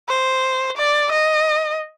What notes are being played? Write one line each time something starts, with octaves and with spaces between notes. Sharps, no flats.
C5
D5
D#5